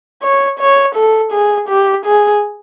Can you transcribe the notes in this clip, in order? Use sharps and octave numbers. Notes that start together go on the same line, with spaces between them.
C#5
C#5
A4
G#4
G4
G#4